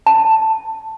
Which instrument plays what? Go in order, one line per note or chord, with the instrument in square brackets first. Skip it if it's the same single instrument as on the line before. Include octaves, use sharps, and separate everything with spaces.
[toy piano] A5